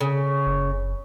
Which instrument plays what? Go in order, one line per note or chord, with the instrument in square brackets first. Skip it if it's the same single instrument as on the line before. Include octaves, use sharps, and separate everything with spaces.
[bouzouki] C#3
[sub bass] F#1